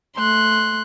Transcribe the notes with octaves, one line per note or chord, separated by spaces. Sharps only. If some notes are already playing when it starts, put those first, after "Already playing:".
A3 C6 F#6